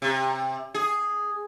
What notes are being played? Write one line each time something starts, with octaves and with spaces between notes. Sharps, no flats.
C3
G#4